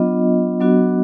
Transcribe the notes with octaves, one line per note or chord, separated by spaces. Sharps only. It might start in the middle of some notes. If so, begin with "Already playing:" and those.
Already playing: F#3 B3 D4 F4 D#5
F#3 B3 D4 F#4